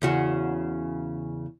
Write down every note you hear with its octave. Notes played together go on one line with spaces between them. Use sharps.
E2 C#3 F#4